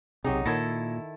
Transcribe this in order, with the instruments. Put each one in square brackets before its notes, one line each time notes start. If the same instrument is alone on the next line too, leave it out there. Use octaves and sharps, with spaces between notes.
[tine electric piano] B1 G4 G#4 [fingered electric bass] C3 [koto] F#3 D#4
[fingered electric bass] A#2 [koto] D#3 E4 A4 [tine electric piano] G#6 A#6